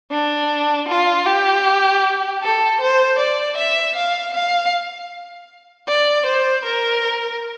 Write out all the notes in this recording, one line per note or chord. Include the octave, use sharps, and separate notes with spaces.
D4
F4
G4
A4
C5
D5
E5
F5
F5
D5
C5
A#4